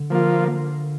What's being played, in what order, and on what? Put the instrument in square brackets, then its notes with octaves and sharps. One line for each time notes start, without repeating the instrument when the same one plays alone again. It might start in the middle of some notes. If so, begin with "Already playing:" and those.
Already playing: [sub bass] D3
[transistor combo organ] F3 A#3 F4